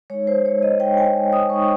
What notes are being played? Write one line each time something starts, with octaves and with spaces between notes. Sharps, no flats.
G#3 D#4 C#5
C5
C#5
D#5
G#3 D#4 G5
G#5
D#6
G#3 D#4 C#6